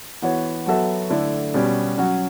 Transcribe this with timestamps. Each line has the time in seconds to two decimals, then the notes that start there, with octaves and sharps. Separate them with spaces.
0.22 E3 B3 F#4 C#5
0.66 F#3 B3 F#4 A4 E5
1.10 D3 A3 E4
1.54 B2 G3 C#4 G4
1.98 F#3 C#4 F#4